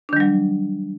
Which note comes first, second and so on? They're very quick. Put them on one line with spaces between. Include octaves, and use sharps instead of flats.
D4 D#3 G3 F#3